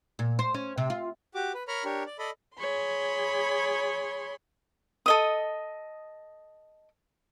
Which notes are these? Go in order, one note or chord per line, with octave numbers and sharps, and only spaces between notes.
A#2
C5
C#4
C3
F4
F#4 G4 D6
B4
A#4 C#5 A#5 B5 F6
D4 G4 A#4 C#5
D5
A4 D5 D#5 B5
G#4 C#5 B5 C6
A4 D#5 D#6